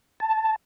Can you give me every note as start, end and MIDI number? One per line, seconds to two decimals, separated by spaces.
0.20 0.56 81